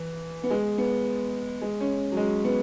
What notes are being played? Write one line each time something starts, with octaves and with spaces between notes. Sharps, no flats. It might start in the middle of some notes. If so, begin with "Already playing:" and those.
Already playing: E3
B3
G#3
B3
G#3
C#4
F#3
G#3
B3